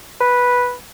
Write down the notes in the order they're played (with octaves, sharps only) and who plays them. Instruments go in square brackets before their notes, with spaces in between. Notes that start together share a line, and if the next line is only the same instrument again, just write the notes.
[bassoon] B4